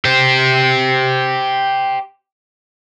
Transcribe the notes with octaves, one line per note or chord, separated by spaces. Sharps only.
G4 C5